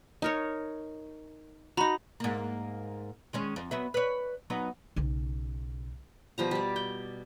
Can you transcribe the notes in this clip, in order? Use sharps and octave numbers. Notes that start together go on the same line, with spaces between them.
D#4 A#4 C#5
D#4 F#4 A#5 B5
G#2 A#3
D#3 G#3 C#4
F2
F#3 B3 E5
B4 C#5
F#3 B3 D#4
B1 C#3
B2 F3 G3 A#5
G3 D5
G5